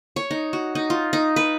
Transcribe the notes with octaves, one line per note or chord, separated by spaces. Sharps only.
C#5
D#4
F#4
D#4
F4
D#4
B4